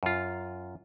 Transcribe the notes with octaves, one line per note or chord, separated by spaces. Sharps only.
F#2 F4